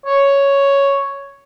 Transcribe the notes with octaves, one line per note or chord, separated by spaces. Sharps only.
C#5